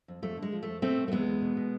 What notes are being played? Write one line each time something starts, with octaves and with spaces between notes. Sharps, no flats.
F2
F2 A3
D3
G#3
F3
F2 A3
B2 A3 C4
B2
A3
E2 G#3 B3
E2
B2
B2